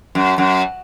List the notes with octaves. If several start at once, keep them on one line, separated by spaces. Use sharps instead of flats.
F#2
F#2